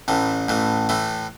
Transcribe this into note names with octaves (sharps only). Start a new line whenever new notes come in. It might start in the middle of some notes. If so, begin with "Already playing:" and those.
A1 A2 E3
A1 A2 E3
A2 E3 A3